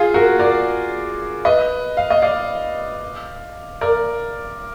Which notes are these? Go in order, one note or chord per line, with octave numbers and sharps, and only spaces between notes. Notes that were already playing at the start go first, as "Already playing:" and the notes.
Already playing: F4 G#4
F#4 A#4
A#4 D5
B4 D#5
F5
D#5
D5 F5
A#4 D5